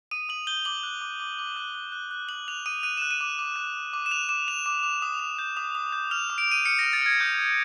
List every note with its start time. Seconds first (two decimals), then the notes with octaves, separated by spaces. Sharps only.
0.11 D#6 D#7
0.29 D#6 F#7
0.47 G6 G7
0.65 D6 F#7
0.83 F#6
1.01 D6
1.20 D6
1.39 D6
1.56 F#6
1.74 F#6
1.92 F#6
2.11 F#6
2.29 D#6 F#7
2.48 F#6 F7
2.66 D#6 D#7
2.83 F#6 D#7
2.97 F#6 E7
3.11 D#7
3.21 D6
3.39 D6
3.56 F#6
3.74 D6
3.93 D6
4.06 E7
4.11 F#6 F7
4.29 D6 E7
4.47 D6 F7
4.66 D6
4.83 D6
5.02 D#6
5.20 D#6
5.39 G6
5.57 D#6
5.75 D#6
5.92 G6
6.11 F6 F7
6.30 D6
6.38 D7
6.47 D6 D#7
6.65 F6 C#7
6.79 A#6
6.84 F6
6.93 A6
7.02 F6 G#6
7.20 D#6 G6
7.39 D#6